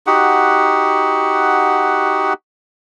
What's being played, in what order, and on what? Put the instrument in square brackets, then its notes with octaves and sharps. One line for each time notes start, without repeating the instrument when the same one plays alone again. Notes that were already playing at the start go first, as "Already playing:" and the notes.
[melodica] D#4 F#4 G4 F#5